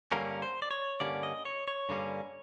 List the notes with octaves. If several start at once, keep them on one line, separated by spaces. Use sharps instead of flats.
G2 D3 G3 A#3 C#4 A#4
C5
D5
C#5
G2 D3 G3 A#3 C#4 D5
D#5
C#5
C#5
G2 D3 G3 A#3 C#4